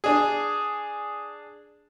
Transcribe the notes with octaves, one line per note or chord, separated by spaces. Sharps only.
D4 G#4